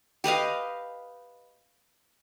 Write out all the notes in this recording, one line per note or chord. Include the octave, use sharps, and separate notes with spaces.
G4 B4 D#5 F5